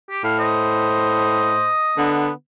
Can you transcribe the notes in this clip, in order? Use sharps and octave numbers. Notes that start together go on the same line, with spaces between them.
G4
A2 F5
C5 D#5
D3 B3